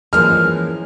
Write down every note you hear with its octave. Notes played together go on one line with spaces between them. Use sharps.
F#2 E3 F3 G#3 A#3 F6